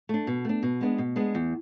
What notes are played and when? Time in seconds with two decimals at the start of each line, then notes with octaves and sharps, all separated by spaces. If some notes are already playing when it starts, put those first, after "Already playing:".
0.09 A3 D4
0.27 B2
0.45 A3 D4
0.63 B2
0.81 G#3 B3 D4
0.98 B2
1.16 G#3 B3 D4
1.35 E2